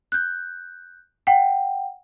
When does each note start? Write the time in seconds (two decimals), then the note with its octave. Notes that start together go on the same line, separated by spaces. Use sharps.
0.12 F#6 G6
1.27 F#5 G5